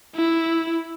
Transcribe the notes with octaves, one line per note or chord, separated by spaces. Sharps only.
E4